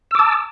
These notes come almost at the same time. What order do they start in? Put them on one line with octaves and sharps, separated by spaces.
E6 D6 A5